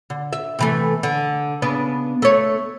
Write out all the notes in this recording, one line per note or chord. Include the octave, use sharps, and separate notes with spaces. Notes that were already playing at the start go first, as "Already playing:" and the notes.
D3
E5
C3 E3 A3
D3
C#3 B3 D4
A3 C#5